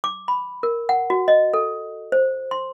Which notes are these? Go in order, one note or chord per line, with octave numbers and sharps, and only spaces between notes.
D6
B5
A#4
F#5
F#4
D#5
A4
C5
C6